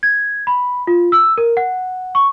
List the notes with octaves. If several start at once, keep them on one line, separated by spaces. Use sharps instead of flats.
G#6
B5
F4
E6
A#4
F#5
C#6